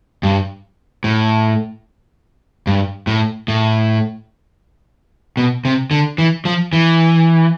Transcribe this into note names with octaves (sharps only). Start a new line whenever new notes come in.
G2
A2
G2
A2
A2
B2
C3
D3
E3
F3
E3